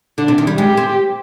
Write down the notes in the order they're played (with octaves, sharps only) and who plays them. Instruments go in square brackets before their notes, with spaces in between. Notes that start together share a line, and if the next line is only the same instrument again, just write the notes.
[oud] D3 [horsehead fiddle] D4
[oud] C3
D#3
G3
[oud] G#3 [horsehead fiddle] G4
[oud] C4